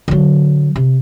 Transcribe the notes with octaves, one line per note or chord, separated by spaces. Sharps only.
D3 F#3
C3